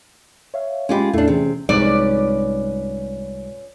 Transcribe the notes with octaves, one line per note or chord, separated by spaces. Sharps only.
C#5 E5 F5
G#3 C#4 F4 G4 D#5 B5
E2 A3 D4 E4 C7
C3 E3 C#4 G#4
C2 G#2 F3 C#4 B4 D5